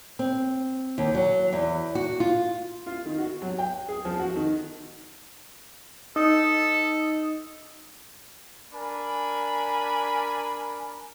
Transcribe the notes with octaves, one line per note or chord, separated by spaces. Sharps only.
C4
D#2
F#3
E2
F#4
F4
F4
D#3
F#4
F#3
G5
G#4
F3
F#4
D#3
D#4 A4
D4 A#4 G#5 B5